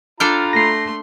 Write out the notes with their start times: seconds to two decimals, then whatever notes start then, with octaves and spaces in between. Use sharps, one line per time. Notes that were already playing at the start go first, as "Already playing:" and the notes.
0.20 D4 F4 A4 G5 A#5 B5 F6
0.53 A3 C6 A#6 C7